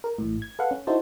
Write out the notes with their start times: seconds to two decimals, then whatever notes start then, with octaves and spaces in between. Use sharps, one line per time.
0.04 A#4
0.19 A1 A2
0.42 G#6
0.59 A4 B4 F5 F#5
0.71 C#4
0.87 D#4 E4 F#4 A4 C5 A5